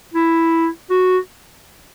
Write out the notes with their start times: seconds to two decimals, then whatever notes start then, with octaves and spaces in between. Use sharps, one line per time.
0.14 E4
0.90 F#4